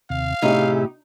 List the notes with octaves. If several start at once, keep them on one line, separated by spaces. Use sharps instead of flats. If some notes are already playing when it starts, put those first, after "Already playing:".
D#2 C3 F5
A2 C3 D#4 G4 G#4 E5